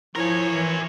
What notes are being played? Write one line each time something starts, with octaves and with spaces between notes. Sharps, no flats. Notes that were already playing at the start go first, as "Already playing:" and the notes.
F3 E4 A#4 C#5 G#5
E3